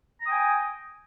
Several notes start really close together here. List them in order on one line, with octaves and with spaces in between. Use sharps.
A#5 D#6 G5 G#5